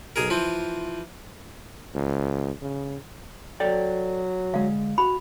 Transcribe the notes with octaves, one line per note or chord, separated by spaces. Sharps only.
B1 G#4 A#4
E3 F3 C4
C#2
C#3
F#3 A4 D5 G5
D3 G#3 F5
F#4 B5